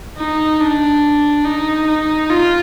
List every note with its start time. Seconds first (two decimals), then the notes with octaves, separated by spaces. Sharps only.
0.17 D#4
0.61 D4
1.45 D#4
1.87 D#4
2.30 F4